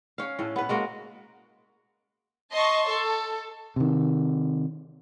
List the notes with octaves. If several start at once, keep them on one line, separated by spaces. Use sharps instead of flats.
C#4 F5
A2 A3
B3 B4
G#3 A#3 F#4
D#5 A5 C6 C#6
A4
C3 D#3